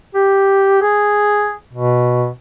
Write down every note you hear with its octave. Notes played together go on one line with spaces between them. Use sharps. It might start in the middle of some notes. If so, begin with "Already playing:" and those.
G4
G#4
B2